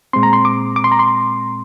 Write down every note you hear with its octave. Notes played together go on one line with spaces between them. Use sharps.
A#2 G#3 C4 C6
A#5
C6
D6
D6
C6
A#5
C6